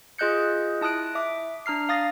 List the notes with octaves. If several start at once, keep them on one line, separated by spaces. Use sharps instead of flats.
F4 G#4 D#5 F#6 G6 C#7
E4 A5 D#6 F#6 D7
E5 D6
D4 A#5 F6 C7
F5 D#6 A6 A#6